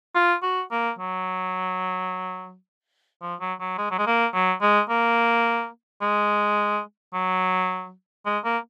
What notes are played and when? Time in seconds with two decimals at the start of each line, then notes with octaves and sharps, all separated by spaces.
0.15 F4
0.42 F#4
0.71 A#3
0.99 F#3
3.22 F3
3.40 F#3
3.60 F#3
3.78 G#3
3.91 F#3
3.98 G#3
4.07 A#3
4.34 F#3
4.62 G#3
4.89 A#3
6.02 G#3
7.14 F#3
8.25 G#3
8.44 A#3